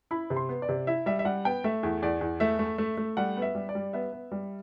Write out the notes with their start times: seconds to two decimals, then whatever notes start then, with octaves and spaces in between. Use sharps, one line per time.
0.11 E4 B5
0.30 C3
0.36 C6
0.49 B3
0.62 D5
0.69 C3
0.87 E4 E5
1.06 G3 E5
1.19 E5
1.25 G3 F#5
1.45 B3 G5
1.64 A3 E5
1.83 E2
2.02 E2 D5
2.21 E2
2.40 A3 E5
2.59 A3
2.78 A3
2.97 A3
3.17 G3 F#5
3.37 B3
3.42 E5
3.55 G3
3.69 D5
3.75 G3
3.93 B3 E5
4.12 B3
4.32 G3